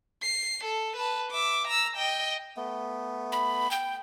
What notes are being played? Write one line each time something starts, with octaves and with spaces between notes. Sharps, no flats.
C7
A4
B4 A5
E5 D6
A#5 E6
D#5 G5
A3 B3
B5
G5